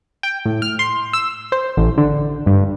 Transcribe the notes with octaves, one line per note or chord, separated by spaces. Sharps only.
G5
A2
F6
C6
E6
C5
A1
D3
G2